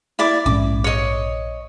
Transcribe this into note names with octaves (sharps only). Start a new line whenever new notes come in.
E4 D5 D6
A#1 G#2 C#4 D6
C#5 D#5